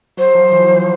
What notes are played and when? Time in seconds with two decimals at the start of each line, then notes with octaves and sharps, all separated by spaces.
0.17 F#3 C5
0.35 F3
0.52 E3
0.69 F3